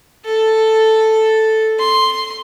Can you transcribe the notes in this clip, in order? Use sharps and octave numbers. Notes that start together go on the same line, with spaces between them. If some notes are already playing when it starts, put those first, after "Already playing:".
A4
C6